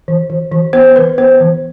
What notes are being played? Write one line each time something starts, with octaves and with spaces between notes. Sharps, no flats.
E3
E3
E3
B3 C5
E3 B4
B3 C5
E3